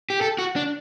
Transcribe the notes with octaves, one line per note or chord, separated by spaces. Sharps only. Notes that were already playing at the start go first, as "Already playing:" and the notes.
G4
A4
F#4
D4